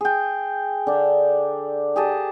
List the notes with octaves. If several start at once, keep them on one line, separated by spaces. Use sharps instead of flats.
G#4 G5
D3 D4
G4 G#4 D#5 A5